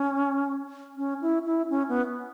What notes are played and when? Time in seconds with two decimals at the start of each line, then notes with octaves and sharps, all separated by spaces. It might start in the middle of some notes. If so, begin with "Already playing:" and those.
Already playing: C#4
0.97 C#4
1.21 E4
1.45 E4
1.70 C#4
1.89 B3